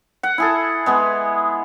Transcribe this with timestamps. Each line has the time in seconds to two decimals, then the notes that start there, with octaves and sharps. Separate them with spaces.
0.23 F#5
0.38 E4 G#4 A4
0.86 G#3 B3 G#4